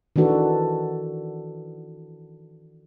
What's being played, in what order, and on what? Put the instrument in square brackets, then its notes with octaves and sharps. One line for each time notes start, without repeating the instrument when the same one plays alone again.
[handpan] D#3 E3 D4 F#4 A4 B4